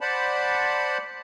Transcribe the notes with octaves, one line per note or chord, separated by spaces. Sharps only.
C5 D5 F#5 A5 B5